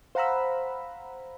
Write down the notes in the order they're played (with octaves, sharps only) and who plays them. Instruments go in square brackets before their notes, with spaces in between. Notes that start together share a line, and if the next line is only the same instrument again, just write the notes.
[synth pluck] C5 F5 F#5 A#5 B5 E6